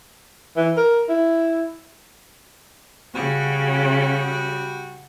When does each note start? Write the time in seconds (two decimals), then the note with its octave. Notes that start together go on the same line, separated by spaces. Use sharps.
0.56 E3
0.77 A#4
1.09 E4
3.14 C#3 G3 F#4